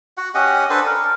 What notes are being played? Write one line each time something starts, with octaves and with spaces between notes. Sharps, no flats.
F#4 F#5
C#4 G4 D#5 F#5
D4 A4 B4 C5
A#4